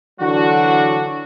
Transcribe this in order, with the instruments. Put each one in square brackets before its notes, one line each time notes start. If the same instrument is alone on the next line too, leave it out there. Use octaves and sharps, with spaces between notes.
[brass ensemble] D3 E3 F#3 D4 F#4